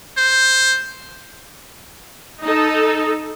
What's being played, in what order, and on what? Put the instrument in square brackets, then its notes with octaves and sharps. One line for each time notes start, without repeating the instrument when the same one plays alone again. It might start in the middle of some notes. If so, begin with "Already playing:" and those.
[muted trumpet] C5
[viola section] D#4 A4